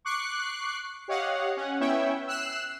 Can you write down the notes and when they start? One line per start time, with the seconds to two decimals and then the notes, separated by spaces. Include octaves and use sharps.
0.05 C#6 D6 F#6 C7
1.08 G4 C#5 D#5 F5 F#5
1.57 C#4 F#5
1.80 B3 C#4 E4 C#5 E5 G5
2.27 E6 F#6 C7 E7